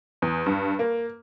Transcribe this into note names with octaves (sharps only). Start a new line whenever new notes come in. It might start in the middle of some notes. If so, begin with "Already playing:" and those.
E2
G2
A#3